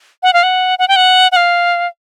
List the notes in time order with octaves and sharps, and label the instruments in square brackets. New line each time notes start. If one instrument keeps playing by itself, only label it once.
[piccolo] F#5
F5
F#5
F#5
G5
F#5
F#5
F5